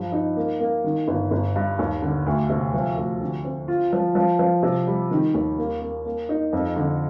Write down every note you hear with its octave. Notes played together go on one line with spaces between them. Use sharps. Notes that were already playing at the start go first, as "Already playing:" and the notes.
Already playing: G2 F3
D#4
A#3
A#3
D#3
G1
G1
G2
D#2
D3
D2
C3
F3
D2
D3
C4
F4
F3
F3
F3
C3
G3
D#3
D#2
A#3
A#3
A#3
D#4
F2
D3